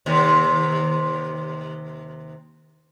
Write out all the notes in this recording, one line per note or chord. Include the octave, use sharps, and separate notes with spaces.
D#2 C3